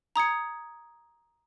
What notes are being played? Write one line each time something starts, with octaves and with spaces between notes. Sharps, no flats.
A#5 D#6 G#6 C#7